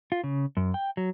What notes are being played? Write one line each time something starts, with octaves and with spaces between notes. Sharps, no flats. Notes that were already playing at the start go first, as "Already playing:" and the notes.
F4
C#3
F#2
G5
F#3